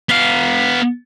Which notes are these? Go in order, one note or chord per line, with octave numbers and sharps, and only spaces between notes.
B3 F5